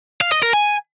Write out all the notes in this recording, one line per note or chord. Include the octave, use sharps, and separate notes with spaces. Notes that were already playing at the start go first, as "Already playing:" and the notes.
F5
D#5
A#4
G#5